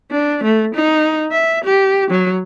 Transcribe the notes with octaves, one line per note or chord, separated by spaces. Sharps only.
D4
A3
D#4
E5
G4
F#3